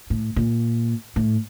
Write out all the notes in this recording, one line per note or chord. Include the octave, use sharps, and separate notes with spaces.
A2
A#2
A2